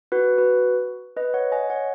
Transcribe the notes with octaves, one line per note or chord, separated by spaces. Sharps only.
F#4 B4
F#4 B4
B4 D#5
C#5 F#5
D#5 G#5
C#5 F#5